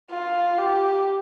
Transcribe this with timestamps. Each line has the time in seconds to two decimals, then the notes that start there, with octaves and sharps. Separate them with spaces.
0.11 F4
0.58 G4